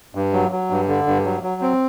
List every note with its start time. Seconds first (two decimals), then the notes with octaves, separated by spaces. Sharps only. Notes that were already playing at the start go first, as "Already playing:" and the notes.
0.15 G2
0.33 F#3
0.52 F#3
0.70 G2
0.88 D3
1.07 G2
1.25 F#3
1.43 F#3
1.61 C4